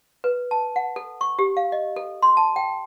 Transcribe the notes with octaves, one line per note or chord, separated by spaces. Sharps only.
B4
A5
F#5
A4
C#6
G4
F5
D#5
A4
C6
A5
G5